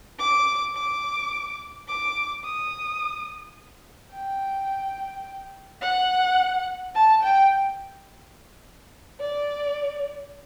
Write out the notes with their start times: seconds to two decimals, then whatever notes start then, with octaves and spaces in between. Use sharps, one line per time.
0.19 D6
0.75 D6
1.88 D6
2.44 D#6
4.13 G5
5.82 F#5
6.95 A5
7.23 G5
9.20 D5